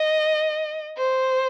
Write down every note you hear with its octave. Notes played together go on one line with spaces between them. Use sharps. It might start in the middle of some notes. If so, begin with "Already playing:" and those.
Already playing: D#5
C5